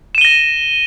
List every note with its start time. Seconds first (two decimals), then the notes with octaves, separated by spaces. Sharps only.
0.15 E7
0.18 D#7
0.21 G7
0.25 A#6